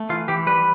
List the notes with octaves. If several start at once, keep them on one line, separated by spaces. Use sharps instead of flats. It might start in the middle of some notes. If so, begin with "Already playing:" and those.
Already playing: A3
E3 F4
E3 G4
G3 B4